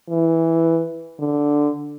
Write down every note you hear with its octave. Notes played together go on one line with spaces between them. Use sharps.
E3
D3